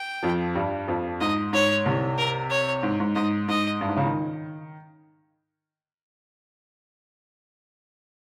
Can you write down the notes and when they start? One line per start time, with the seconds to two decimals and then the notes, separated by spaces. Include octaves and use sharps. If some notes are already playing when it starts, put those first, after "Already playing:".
Already playing: G5
0.23 F2 F3
0.55 G2 G3
0.88 F2 F3
1.21 G#2 D#5
1.53 G#2 C#5
1.86 C2 C3
2.18 A#4
2.50 C#5
2.83 G#2
3.00 G#2
3.15 G#2 D#5
3.48 G#2 D#5
3.81 G2
3.88 G#2
3.97 C#2 C#3
4.06 D#3